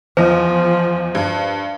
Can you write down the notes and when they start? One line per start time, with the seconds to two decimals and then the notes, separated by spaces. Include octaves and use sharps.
0.17 E2 F3 C5 D#5
1.15 G2